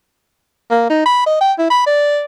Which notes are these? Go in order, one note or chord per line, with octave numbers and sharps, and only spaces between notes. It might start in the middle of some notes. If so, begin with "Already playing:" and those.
A#3
D#4
B5
D#5
G5
E4
B5
D5